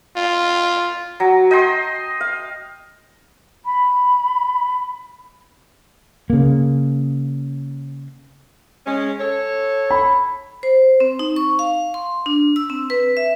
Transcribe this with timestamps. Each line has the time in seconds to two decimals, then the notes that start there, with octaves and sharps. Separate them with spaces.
0.16 F4
1.20 F#3
1.51 D#5 G5 A5 C6
2.21 F5
3.65 B5
6.30 C#3 A#3
8.87 G#3 C#4
9.20 A4 C#5
9.91 B5
10.63 C5
11.00 C4
11.19 D#4
11.36 C#6
11.59 F5
11.94 C6
12.26 D4
12.56 E6
12.70 C4
12.90 B4
13.17 E5